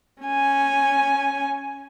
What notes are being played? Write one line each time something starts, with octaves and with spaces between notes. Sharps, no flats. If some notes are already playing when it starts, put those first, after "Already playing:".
C#4 G#5